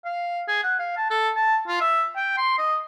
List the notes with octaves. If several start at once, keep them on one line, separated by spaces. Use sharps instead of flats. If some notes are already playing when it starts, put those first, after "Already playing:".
F5
G#4
F#5
F5
A5
A4
A5
F4
E5
G5
C6
D#5